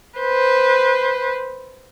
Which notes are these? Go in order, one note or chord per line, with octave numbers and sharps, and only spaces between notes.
B4 C5